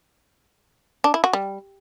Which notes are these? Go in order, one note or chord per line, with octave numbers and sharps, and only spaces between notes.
D4
E4
F#4
G3